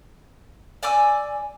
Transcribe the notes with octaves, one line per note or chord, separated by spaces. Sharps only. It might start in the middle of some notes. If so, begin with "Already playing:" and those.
D5 G#5 D6 E6